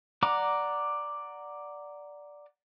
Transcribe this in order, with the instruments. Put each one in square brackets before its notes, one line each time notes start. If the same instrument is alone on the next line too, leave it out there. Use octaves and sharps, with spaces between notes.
[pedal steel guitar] D5 F#5 A#5 D6